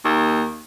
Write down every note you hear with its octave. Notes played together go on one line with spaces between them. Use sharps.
D#2